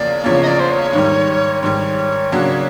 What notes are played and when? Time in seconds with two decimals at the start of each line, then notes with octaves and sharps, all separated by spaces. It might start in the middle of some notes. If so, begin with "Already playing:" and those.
Already playing: E2 C#3 F3 A#3 D5
0.24 E2 C#3 F3 A#3 C#5
0.42 D#5
0.47 D5
0.60 C5
0.70 C#5
0.93 G#2 D#3 G3
1.63 G#2 D#3 G3 C#5
2.32 C#3 F#3 A#3 D4 F#4